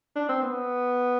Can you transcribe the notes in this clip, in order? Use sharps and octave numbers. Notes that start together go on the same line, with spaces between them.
D4
C4
B3